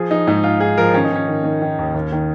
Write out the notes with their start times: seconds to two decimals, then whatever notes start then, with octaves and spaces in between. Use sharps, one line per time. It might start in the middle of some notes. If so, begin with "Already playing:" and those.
Already playing: F3 G#4
0.11 F3 D#4
0.27 G#2 D#4
0.43 G#2 F4
0.60 G#2 G#4
0.77 F3 A#4
0.94 D#3 C#4
1.04 D#4
1.11 D#3 C#4
1.28 D#3
1.44 D#3
1.62 D#3
1.79 D#2
1.94 D#2
2.12 D#3